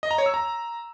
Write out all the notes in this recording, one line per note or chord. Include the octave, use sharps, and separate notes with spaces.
D#5
A#5
C#5
E6
A#5